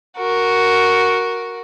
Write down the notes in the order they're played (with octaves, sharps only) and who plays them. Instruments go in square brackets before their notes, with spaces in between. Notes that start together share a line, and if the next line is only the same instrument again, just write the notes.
[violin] F#4 A#4